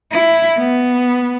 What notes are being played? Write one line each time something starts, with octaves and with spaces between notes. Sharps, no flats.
E4
B3